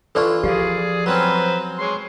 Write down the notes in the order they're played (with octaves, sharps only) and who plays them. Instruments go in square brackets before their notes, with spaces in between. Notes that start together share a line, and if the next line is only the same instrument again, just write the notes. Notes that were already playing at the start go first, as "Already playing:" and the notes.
[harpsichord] E3 D4 F4 [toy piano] A4 D5 C#6
[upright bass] F3 [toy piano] G4 F5 [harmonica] G#4 D5
[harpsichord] F#3 C4 C#4 [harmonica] B4 C5 A#5
[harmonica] G#3 C#5 C6